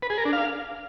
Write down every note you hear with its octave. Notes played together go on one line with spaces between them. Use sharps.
B4
G#4
A#4
D4
F5